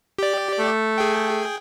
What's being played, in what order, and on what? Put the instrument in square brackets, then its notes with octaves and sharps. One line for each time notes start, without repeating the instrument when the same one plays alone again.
[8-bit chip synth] G4 D5
[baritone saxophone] A3
[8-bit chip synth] G#4 G5